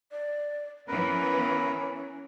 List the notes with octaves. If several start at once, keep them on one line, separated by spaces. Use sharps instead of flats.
D5
E3 B3 C#4 A#4 B4